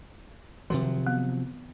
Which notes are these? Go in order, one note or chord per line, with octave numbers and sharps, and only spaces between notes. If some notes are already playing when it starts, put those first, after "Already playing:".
C3 D#3 F3 F#3
B3